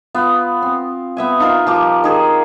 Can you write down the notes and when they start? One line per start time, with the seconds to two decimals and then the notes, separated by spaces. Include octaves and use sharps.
0.15 B3 F4
0.62 C4
1.17 B3 E5 G#5
1.40 D#4 F4 A#4 C6
1.67 F3 G4 D6
2.04 D#3 G#4 C5